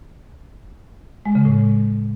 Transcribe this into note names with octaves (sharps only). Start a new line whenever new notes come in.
G#3
C#3
A2